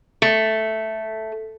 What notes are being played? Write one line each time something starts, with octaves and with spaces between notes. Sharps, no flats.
A3